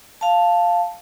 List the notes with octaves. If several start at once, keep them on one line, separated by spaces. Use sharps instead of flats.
F5 A5